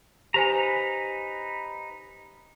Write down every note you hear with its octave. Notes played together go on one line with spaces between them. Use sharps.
D#4 G4 B4 C5 G#5 A#5